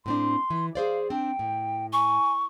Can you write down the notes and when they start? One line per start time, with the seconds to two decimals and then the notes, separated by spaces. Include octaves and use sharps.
0.06 A2 C4 D4 C6
0.50 E3
0.75 G#4 C5 D5 F5
1.10 C4 D4 G5
1.39 A2
1.93 G#5 C#6